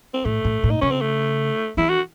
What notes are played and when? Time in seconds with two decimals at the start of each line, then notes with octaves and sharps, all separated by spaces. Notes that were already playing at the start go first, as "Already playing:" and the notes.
0.14 C4
0.25 A2 A3
0.45 A2
0.63 A2
0.70 D#4
0.81 C#3 C#4
0.91 C4
1.01 A3
1.77 E3 E4
1.89 F#4